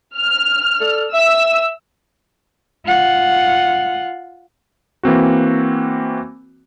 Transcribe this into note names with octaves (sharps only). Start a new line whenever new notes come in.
F6
A4 D5
E5 E6
F4 F#5
E3 A#3 C4 F#4